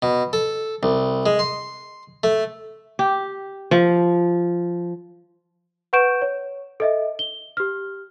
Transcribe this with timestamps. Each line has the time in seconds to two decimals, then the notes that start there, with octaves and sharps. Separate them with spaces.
0.02 B2
0.33 A4
0.83 C2
1.26 G#3
1.39 C6
2.24 A3
2.99 G4
3.71 F3
5.93 B4 F#5 C#6 G6 D7 E7
6.22 C#5
6.80 A4 D#5 E5
7.19 G7
7.57 G4 F6